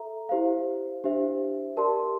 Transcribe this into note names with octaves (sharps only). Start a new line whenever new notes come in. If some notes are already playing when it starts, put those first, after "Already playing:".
Already playing: A4 E5 A#5
E4 G4 C5 F5
D4 G4 C5 E5
G4 A#4 D5 A5 C6